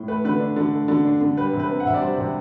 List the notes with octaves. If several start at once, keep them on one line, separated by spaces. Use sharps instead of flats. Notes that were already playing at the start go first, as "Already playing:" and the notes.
Already playing: A2
A3 B4
D3 B4
D4
D3
A3
D3
D4
D3
G3 B4
C3
B4
C4
F#5
C3 E5
D5
G3 C5
C3